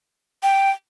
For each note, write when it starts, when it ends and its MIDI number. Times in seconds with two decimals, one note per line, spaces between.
0.43 0.70 79